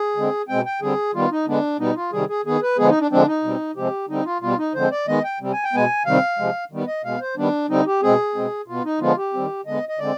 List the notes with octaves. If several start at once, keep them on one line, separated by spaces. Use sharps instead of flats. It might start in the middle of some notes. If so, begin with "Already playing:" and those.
Already playing: G#4
D3 G#3 C4
B2 G#3 C4 G5
G5
D3 G3 C4 G#4
D#3 G3 B3 F4
D#4
D3 G#3 B3 D4
B2 G3 B3 D#4
F4
C3 D#3 G3 G#4
G#4
D#3 B3 G#4
B4
D3 F3 G#3 B3 G#4
D#4
D4
D3 F3 G#3 C4 D4
D#4
B2 G3 C4
C3 F3 G#3 C4 G4
D3 G3 C4 D#4
F4
B2 G3 B3 F4
D#4
D3 F3 G#3 C4 C5
D5
D#3 G#3 B3 D#5
G5
C3 G3 C4
G#5
G5
B2 G#3 B3 G#5
C3 D#3 G3 C4 F5
C3 F3 G#3
D#3 G3 B3
D#5
B2 G#3 B3 F5
C5
D#3 G3 B3 D4
D3 G3 C4 D#4
G4
B2 G#3 C4 G#4
B2 G#3 C4
B2 B3 F4
D#4
D3 F3 G#3 B3 F4
G4
D#3 G3 C4
D3 G#3 B3 D#5
D#5
D3 G#3 C4 D5